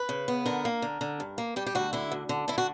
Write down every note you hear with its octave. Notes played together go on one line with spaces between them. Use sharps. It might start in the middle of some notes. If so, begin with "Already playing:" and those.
Already playing: B4
C#3
B3
D3 A#4
A#3
D3
D3
G2
A#3
G3 G4
G4
D2 F#4
D3 E4
D2
D3
D3 E4
F#4